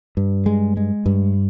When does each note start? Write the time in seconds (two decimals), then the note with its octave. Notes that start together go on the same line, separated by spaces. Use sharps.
0.17 G2
0.46 G#3
0.77 G#3
1.06 G2